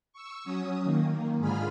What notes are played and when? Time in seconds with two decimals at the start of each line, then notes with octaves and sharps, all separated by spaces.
0.13 C#6 E6
0.44 F#3 C#4 D#6
0.84 D#3 A#3
1.38 G#2 D3 F4 G#4 B5 F6